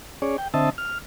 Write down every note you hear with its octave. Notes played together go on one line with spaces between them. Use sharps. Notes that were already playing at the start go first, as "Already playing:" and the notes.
C#4 G#4 C#5 D5
G5
D3 C4 D#5 E5 A5
F6